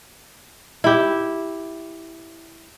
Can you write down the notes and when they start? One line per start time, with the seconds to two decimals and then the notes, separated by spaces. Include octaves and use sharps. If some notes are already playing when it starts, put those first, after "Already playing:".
0.84 E4 G4